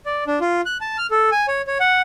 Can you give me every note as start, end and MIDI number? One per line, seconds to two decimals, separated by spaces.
0.06 0.24 74
0.27 0.39 62
0.41 0.61 65
0.66 0.78 90
0.81 0.97 81
0.98 1.07 89
1.11 1.30 69
1.31 1.46 80
1.48 1.62 73
1.67 1.78 73
1.80 2.02 78